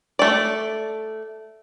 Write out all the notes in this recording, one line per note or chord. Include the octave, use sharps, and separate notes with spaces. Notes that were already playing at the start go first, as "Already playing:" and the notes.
A3 D5